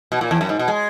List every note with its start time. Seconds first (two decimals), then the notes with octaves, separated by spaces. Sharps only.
0.12 B2
0.21 A#2
0.31 E2
0.41 F#2
0.49 G#2
0.59 B2
0.68 G#3